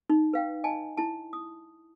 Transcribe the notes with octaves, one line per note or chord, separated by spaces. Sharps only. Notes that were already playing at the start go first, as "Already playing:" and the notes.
D#4
B4 F5 G5
D#5 G#5 A5
E4 A5
D#6